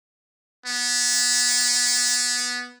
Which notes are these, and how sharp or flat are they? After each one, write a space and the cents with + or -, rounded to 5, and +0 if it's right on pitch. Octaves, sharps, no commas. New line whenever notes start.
B3 -10